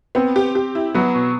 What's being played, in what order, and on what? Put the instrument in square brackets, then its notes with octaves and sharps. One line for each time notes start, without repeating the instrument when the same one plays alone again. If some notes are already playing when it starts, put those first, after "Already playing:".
[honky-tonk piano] B3 [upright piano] C4
[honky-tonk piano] G4
G4
E4
[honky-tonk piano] F#3 [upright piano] B3
[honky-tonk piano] B2